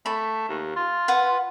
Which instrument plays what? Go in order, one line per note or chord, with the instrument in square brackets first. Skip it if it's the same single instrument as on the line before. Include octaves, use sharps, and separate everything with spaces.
[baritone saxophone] A3 [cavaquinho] B5
[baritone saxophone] D#2
F4
[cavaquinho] B4 F#5